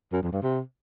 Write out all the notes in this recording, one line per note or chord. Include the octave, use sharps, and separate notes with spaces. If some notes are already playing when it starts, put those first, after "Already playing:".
F#2
F2
G2
C3